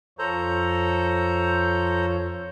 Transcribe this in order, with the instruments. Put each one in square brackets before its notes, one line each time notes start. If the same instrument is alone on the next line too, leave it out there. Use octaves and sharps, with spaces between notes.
[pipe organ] F2 F4 C#5 [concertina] A4 C5 A#5